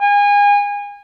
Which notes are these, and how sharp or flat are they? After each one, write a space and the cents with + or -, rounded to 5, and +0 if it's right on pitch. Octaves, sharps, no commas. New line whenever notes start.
G#5 -30